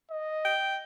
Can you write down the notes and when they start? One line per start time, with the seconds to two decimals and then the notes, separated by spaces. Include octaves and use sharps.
0.11 D#5
0.45 G5